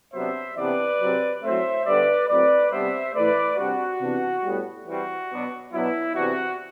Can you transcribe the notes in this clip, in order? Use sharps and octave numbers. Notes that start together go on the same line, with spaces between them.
C3 F#3 B3 D4 C5 E5
C3 E3 B3 D4 B4 D5
C3 F#3 C4
A2 F#3 A3 C4 C5 E5
D3 G3 B3 D4 B4 D5
A2 F#3 C4 B4 D5
C3 G3 B3 D4 C5 E5
A2 E3 A3 B4 D5
C3 G3 D4 F#4
C3 E3 B3 D4
A2 G3 B3
E3 G3 C4 F#4
B2 F#3 B3 D4
B2 F#3 B3 D4 E4
C3 E3 B3 D4 F#4